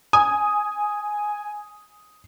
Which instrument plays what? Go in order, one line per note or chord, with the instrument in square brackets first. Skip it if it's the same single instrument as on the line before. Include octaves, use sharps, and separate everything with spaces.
[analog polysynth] G#5 [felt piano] D#6